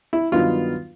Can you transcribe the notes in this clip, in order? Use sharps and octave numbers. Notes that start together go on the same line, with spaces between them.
E4
G2 D#3 F#3 B3 D#4 F4